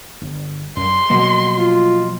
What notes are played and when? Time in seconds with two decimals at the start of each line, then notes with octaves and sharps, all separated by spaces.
0.22 G1
0.77 F#2 C6
1.10 B2 F3 F#3 A#3 F#4 D#5
1.58 F4